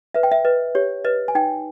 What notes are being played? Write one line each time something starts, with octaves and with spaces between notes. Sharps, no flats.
B4 E5
G5
E5
B4 D#5
G4 C#5
B4 D#5
G#5
D#4 G5